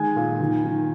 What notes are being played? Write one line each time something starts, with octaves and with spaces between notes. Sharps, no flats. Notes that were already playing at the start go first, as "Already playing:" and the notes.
Already playing: D#3 G#3 G#5
A#2
D#3
D#3